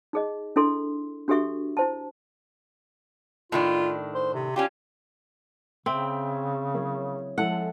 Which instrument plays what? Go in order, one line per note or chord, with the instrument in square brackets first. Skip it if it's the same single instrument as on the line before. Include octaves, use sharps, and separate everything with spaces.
[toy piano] D#4 G#4 D#5
D4 E4 A4 C6
D4 F#4 G4 A4 E5 C#6
E4 C5 A5
[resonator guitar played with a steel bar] A2 D#3 D4 [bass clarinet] F4
[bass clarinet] C5
C3
[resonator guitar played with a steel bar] C#4 D4 F4 [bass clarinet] G4
[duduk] C#3 [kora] C4 [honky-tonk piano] E5 G5 D7
[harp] G#4
[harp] F#3 E4 G#4 [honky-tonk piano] A#3
[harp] F3 E5 F#6 [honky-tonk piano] G#3 E4 A4 [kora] F#5